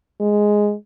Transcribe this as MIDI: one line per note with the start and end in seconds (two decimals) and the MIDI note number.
0.20 0.74 56